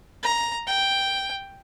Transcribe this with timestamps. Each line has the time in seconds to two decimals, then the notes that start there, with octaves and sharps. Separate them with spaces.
0.23 A#5
0.67 G5